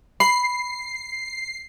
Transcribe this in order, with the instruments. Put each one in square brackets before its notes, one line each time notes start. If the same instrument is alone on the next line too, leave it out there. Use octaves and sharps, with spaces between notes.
[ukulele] B5 [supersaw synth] C7